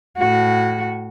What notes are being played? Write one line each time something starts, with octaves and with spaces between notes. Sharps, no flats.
A2 F#4